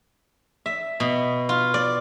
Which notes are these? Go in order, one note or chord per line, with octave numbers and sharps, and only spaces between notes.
E5
B2
F4
D5